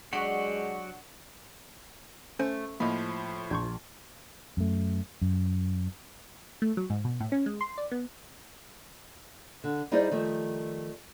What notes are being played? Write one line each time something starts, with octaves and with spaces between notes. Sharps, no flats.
F#3 G#3 D4 F#4 G4 F#5 C#6
A3 C#4 C5
A2 F3 A#3 D#5 B5
A#1 C6 C#6 G6 G#6
F#2 A3
F#2
A3
F#3
G#2
B2
A2
C#4
G#3
C6
D5
B3
D3
G3 D#4 E4 G#4 C5 D5
D#3 F3 G3 A3